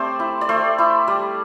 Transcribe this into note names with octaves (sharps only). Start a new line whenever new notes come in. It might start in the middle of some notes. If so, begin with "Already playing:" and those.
Already playing: A3 C4 G4 A4 C5 D5
E4
D5
A3 C5
E4
G3